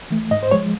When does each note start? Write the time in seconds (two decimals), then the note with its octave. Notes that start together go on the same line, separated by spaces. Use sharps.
0.10 E3 A3
0.31 G#2 D#5
0.43 C5
0.51 F3 G#3 C#5